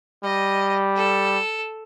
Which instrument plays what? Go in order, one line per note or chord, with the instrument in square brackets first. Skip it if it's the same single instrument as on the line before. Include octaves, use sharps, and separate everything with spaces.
[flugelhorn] G3 [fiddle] D#5
[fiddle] A4